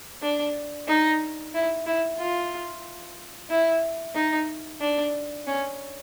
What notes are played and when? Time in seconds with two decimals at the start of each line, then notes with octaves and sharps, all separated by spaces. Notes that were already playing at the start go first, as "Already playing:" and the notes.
0.22 D4
0.88 D#4
1.54 E4
1.86 E4
2.19 F4
3.50 E4
4.15 D#4
4.81 D4
5.47 C#4